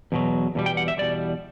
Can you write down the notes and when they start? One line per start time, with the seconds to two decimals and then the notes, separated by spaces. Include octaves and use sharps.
0.12 E2 B2 F#3
0.55 E2 B2 G3
0.66 G5
0.77 F#5
0.88 E5
0.98 E2 B2 G3 D5